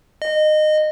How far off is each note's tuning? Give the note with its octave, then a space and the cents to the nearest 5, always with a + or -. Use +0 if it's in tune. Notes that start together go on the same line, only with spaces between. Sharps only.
D#5 -20